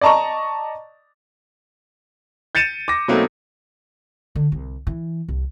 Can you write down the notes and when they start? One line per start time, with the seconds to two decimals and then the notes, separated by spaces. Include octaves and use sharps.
0.01 D5 D#5 A5 A#5 C#6
2.55 G6 A6 C#7 D#7 E7
2.88 D6 A#6
3.08 B2 F#3 A3 A#3 C4 D#4
4.36 D3
4.52 C2
4.87 E3
5.28 C2